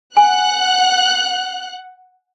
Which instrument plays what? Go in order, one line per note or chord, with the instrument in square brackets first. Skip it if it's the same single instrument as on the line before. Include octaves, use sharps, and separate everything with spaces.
[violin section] F#5 F#6 [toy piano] G#5